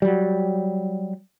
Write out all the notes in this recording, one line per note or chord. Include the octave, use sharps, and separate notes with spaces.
F#3 G3